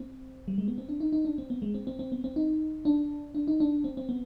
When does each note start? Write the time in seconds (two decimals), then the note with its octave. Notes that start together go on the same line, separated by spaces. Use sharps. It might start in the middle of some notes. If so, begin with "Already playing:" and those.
Already playing: C4
0.48 G3
0.58 G#3
0.68 B3
0.78 C4
0.89 D4
1.00 D#4
1.12 D#4
1.25 D4
1.38 C4
1.50 B3
1.62 G#3
1.74 C4
1.87 C4
1.99 C4
2.12 B3
2.24 C4
2.36 D#4
2.85 D4
3.35 D4
3.48 D#4
3.60 D4
3.84 C4
3.97 C4
4.09 B3